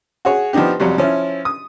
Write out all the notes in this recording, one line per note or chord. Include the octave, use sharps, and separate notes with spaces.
F#4 G#4 C#5
F3 B3 D4 D#4 G4
F2 C3 F#3 G3
F3 C#4 E4
D#6